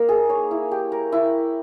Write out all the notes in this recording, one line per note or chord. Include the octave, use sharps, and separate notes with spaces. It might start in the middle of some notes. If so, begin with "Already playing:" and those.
Already playing: A#3 D#4 A#4
G#4
C#5
E4
G4
A#4
E4